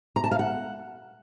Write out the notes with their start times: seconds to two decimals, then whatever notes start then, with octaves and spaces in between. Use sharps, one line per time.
0.16 A#5
0.24 A5
0.31 F5
0.39 F#5